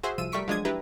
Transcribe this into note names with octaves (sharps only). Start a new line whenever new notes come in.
F#4 G#4 C5 E5
C2 F3 E6 D#7
G3 A3 A#4 C#6 B6 D7
F3 F#3 G#3 D4 D#6 G#6
D4 E4 G4 B4 A#5